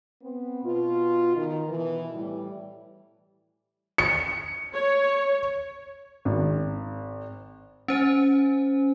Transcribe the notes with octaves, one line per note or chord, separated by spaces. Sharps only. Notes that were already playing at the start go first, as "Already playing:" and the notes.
B3 C4
B2 F4
D#3
B2 E3
A2 E3 G3
C#7
C#5
G#1
C#4 C5 G#5